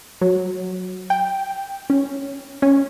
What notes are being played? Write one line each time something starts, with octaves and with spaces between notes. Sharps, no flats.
F#3
G5
C#4
C#4